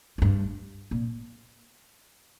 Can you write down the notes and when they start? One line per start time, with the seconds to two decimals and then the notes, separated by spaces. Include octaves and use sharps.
0.18 A2
0.22 G2
0.91 A#2